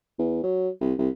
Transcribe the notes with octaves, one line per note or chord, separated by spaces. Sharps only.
E2
F#3
C2
C2